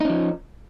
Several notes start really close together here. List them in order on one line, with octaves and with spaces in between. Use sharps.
D#4 C#4 F3